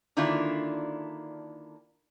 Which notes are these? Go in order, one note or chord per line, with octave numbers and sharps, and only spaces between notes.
D3 D#3 A#3 D4 E4 F4